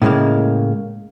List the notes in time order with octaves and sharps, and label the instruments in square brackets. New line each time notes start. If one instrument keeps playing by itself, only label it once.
[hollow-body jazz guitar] A2 C#3 E3 G#3 A#3